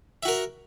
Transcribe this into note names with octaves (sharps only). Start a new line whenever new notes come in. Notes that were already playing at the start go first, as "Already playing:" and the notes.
F#4 A#4 E5